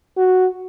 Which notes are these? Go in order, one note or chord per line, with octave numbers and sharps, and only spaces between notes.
F#4